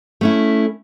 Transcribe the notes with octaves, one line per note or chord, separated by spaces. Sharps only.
A3 C#4 E4